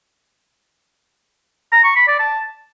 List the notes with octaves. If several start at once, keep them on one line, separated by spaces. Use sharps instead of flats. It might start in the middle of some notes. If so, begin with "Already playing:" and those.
A#5
C#6
B5
D5
A5